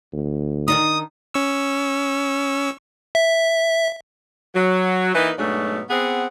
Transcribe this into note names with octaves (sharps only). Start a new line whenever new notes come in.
D2
D#3 D4 D#4 D#6
C#4 C#6 E6
E5
F#3
E3 A#3 D#4 B4
G#2 B2 F#3 A3 D4
B3 C4 G#4 F#5